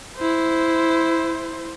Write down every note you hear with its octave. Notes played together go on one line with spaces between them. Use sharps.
E4 C5